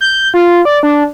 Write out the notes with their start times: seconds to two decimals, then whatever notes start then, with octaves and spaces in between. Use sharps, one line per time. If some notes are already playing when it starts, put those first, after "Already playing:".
0.01 G6
0.34 F4
0.65 D5
0.83 D4